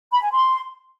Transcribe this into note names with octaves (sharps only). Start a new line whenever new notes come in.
B5
G#5
C6